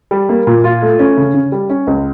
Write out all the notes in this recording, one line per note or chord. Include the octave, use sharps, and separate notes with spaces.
G3
A#3
A#2
F4
A3
C#4
C#3
C#3
G3
C#4
C#2